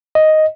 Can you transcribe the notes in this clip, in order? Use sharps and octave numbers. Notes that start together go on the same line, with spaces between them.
D#5